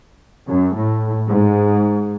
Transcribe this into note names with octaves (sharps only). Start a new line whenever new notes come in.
F#2
A2
G#2